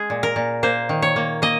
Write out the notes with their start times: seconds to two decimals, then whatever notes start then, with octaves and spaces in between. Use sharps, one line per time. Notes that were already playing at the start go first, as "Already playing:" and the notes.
Already playing: G#3 G#4
0.10 A#2
0.23 A#4
0.36 A#2
0.63 A#3 C5
0.89 D#3
1.02 C#5
1.16 A#3
1.42 A#3 D#5